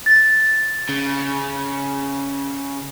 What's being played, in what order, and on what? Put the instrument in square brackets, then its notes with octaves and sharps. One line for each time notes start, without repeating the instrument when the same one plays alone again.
[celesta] A6
[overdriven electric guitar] C#3